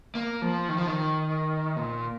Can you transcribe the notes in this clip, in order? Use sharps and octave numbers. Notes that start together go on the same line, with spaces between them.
A#3
F3
D#3
F3
D#3
A#2